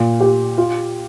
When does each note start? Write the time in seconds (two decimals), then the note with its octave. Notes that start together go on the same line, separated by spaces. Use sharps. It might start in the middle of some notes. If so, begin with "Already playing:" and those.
Already playing: A#2
0.20 G4
0.58 F4